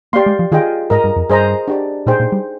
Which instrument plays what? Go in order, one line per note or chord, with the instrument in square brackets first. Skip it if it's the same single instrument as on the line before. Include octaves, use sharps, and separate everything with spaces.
[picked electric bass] A#3 [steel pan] G4 D5 F5 C6
[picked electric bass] G#3
F3
[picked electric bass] D#3 [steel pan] F4 G#4 D#5 G5
[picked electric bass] G#2 [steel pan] A#4 D#5 A#5
[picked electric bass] G2
F2
[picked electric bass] G2 [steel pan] G#4 C5 D#5 A#5
[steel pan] D4 G4 D5
[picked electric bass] A#2 [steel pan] D#4 G#4 C5 G5
[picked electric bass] A#2
G3